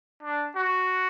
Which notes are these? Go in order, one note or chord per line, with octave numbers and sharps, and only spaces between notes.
D4
F#4